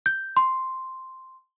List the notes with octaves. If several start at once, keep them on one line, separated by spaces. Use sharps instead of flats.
G6
C6